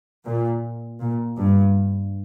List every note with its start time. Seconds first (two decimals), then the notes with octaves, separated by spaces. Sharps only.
0.25 A#2
1.01 A#2
1.38 G2